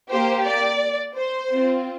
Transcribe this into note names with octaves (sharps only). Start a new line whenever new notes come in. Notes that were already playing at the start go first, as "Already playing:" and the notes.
A#3 G4 C5
D5
C5
C4 F4